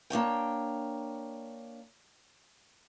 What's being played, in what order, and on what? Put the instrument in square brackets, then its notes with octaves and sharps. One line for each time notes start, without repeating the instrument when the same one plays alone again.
[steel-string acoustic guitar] A#3 D4 C#5 G5